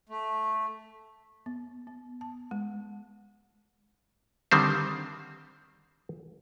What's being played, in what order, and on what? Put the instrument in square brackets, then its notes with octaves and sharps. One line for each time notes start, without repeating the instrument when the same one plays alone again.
[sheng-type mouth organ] A3
[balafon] B3
B3
A5
G#3
[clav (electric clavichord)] D3 D#3 G3 C4 C5